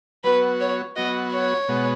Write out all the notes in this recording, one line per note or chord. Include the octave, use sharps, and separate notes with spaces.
F#3 B3 F#4 B4
C#5
F#3 B3 F#4 D#5
C#5
B2 G#3 B3 F#4